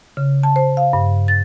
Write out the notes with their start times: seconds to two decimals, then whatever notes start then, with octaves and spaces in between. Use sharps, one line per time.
0.17 C#3
0.43 A5
0.56 C5
0.77 F5
0.93 G2
1.28 A6